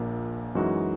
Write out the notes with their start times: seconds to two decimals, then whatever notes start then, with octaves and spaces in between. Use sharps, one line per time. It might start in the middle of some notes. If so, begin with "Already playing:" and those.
Already playing: A#1 A#2 A#3
0.55 F#2 E3 G#3 D#4 F#4